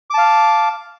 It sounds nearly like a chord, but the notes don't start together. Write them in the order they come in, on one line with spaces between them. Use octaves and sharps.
D6 A5 F5